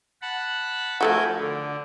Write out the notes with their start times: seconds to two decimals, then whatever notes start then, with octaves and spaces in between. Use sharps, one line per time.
0.22 F#5 A5 B5
1.01 F3 A3 F#4 A#4 G#5 G6
1.38 D3